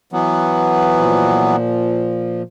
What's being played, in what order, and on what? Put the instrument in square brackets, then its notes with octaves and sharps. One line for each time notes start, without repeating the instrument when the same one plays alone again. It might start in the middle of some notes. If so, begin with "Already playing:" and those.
[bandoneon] E3 F#3 B3
[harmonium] A#2 F3